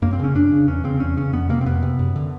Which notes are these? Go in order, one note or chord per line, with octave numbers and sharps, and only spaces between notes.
F#2 A#3
C4
C#3 C#4
F#2 D4
C#3
E2 C#4
C#3 C4
E2 C#4
C#3 C#4
F2 B3
C3 A#3
C4
F2 B3
C3
F#2
D3